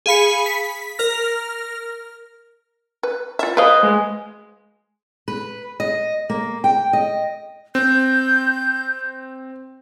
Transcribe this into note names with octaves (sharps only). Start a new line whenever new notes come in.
G#4 F5 B5 C#7
B6
A#4 F6 A#6
B4
F4 E5
B4 C5 D#5 F5
G#3
B4
D#5
A#3
G5
D#5
C4 G6